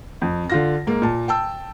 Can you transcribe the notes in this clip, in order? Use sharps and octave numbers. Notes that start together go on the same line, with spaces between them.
F2
D3 F4 A#6
G#2 A#3
A#2 A5
G5 A5 E6